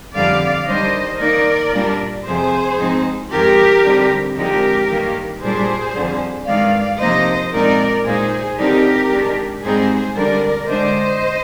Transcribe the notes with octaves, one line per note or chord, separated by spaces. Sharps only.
F2 D3 G3 D5 F5
D#3 G3 D4 C5 D#5
D#3 A#3 D#4 A#4 D5
A#2 G3 D4
F2 C3 F3 G#4 C5
G#2 F3 C4 D#4
F2 D#3 G#3 G4 A#4
D3 G3 C4 D#4
D3 F3 G#3 C4 D#4 G4 A#4
G2 D#3 A#3
A#2 G3 D4 G#4 C5
F2 D3 G3
G2 D#3 G#3 D5 F5
C3 F3 A#3 D#4 C5 D#5
A#2 F3 G#3 C4 D#4 A#4 D5
A#2 G#3 D#4 G#4 C5
D3 G3 C4 D#4 G4 A#4
D#3 G#3 D4
G#2 G3 C4 D#4 G#4 C5
D3 G3 D4 A#4 D5
D3 G#3 D4 C5 D#5